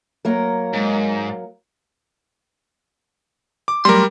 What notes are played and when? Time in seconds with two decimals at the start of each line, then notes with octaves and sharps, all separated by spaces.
0.25 F#3 A#3 A#4
0.73 G#2
3.68 D6
3.85 F#3 G3 A3 A#4 C6